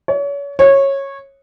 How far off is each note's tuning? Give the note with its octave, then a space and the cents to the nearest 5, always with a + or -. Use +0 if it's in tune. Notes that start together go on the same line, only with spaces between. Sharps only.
C#5 +35
C#5 -15